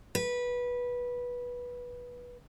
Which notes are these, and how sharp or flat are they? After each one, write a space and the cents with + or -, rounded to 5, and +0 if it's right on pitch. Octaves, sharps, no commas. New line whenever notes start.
B4 -15